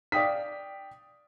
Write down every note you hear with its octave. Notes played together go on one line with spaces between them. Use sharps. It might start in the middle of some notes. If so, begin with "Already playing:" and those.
D5 F5 G5 D#6 B6